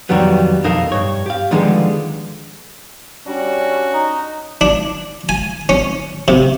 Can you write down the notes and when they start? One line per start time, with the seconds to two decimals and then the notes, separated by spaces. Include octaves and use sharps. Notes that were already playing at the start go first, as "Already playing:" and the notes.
0.09 F2 D#3 F#3 G3 B3
0.64 B1 F2 D#4 A4 A#4 F5
0.92 G2 C#5
1.26 G4 F5
1.51 D3 D#3 F3 G3 G#3 B3
3.27 G3 C#4 D4 F#4
3.93 D#4
4.61 D4
5.29 G#5
5.69 C#4
6.28 C3